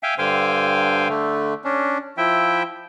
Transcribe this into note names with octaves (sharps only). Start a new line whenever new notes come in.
E5 F5 G5 G#5
G2 D3 C5 F5 G5 G#5
D3 A3
C#4 D4
F3 E4 E5 G5